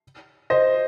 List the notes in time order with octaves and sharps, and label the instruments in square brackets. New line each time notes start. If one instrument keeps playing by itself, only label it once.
[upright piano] C5 D#5